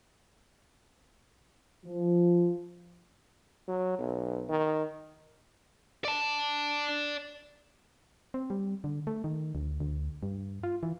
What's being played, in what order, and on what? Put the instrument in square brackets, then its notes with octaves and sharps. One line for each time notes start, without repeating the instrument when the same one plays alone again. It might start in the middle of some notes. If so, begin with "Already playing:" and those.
[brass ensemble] F3
[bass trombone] F#3
B1
D#3
[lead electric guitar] D5 A5
[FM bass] C4
G3
D3
A3
D#3
D2
D2
G2
F4
E3